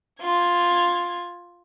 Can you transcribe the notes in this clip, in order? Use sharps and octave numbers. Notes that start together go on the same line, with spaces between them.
F4 G#6